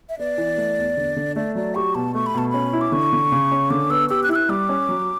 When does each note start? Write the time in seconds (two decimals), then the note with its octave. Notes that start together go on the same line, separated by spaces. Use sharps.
0.09 E5
0.19 B3 D5
0.38 E3
0.58 A3
0.78 E2
0.97 D3
1.16 D3
1.36 A3 D5
1.55 F#3 D5
1.75 G4 C#6
1.95 B2 A5
2.14 A3 C#6
2.26 B5
2.35 B2 A5
2.49 C#4 B5
2.73 E4
2.81 D6
2.92 D3 C#6
3.13 D3
3.32 C#3
3.52 C#4
3.70 D3 D6
3.90 B3 E6
4.09 G4 E6
4.23 F#6
4.29 E4 E6
4.35 F#6
4.49 G3 D6
4.69 C#4
4.89 F#3